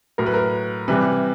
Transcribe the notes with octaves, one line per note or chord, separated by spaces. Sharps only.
A2 F#3 A#4
B4
A#4
C3 E3 G3 B4